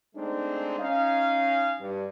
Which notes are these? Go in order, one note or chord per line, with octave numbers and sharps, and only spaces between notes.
G#3 A3 C4 D4 D#4
C#4 D#4 F5
G2